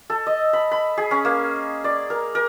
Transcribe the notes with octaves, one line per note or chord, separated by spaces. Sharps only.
A4
D#5
B5
B5
G#4
C#4
A#3
D5
A#4
A#4